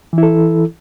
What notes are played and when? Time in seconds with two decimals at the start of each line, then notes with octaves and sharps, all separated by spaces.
0.13 E3
0.18 E4
0.23 A4